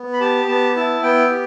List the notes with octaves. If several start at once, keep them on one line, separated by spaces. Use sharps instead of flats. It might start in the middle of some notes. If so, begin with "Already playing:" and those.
Already playing: B3
B5
G4 A5
B3 A5
E4 A5
B3 G5
G4